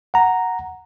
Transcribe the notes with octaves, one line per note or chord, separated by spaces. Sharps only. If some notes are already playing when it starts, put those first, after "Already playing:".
F#5 A#5